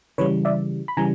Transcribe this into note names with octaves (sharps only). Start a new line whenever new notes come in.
C#3 E3 G3 B4 C#5
D5 E5
B5
C#3 E3 G3 G#5 A#5